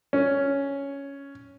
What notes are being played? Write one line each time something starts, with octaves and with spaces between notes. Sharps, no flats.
C#4